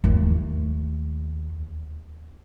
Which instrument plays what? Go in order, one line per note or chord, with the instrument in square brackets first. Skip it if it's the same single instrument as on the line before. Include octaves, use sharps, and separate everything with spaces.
[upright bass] D#2 A3